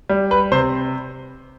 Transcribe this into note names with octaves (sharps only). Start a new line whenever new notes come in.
G3
B4
C3 C5